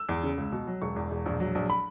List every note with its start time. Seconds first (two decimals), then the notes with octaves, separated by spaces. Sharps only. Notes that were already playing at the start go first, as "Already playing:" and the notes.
Already playing: E6
0.09 E2
0.23 C#3
0.38 C#2
0.52 B2
0.67 F#3
0.82 E1 C#6
0.96 E2
1.11 E1
1.26 A#1
1.40 F#3
1.55 A#1
1.70 B5